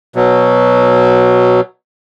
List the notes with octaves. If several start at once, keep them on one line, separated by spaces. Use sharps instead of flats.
B2 F#3